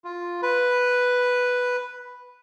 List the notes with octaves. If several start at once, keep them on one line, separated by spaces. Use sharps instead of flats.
F4
B4